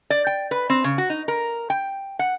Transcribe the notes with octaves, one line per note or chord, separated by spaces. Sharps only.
D5
G5
B4
C4
C#3
F#4
D#4
A#4
G5
F#5